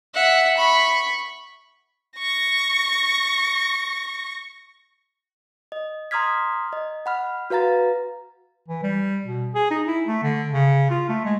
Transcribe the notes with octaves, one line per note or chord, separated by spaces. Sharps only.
E5 F#5
B5 C#6
C#6 A#6
D#5
A#5 C6 D#6 F6 G#6 B6
D#5
F#5 B5 F6
F#4 B4 F5 A#5 A6
E3
G3
B2
G#4
D#4
E4
A3
D3
C#3
F4
A3
G#3